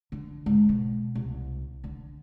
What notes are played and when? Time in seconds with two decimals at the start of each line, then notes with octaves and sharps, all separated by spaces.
0.12 D3
0.46 G#2
0.69 B2
1.15 C2
1.84 D3